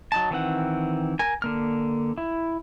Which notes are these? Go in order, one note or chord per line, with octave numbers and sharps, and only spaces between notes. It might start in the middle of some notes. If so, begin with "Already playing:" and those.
F#3 D#4 A5
D#3 E3 C4 F#5
A#4 G#5
D3 A#3 F6
E4